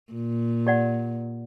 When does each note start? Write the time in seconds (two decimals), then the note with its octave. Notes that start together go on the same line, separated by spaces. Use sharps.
0.13 A#2
0.67 G4 D5 F#5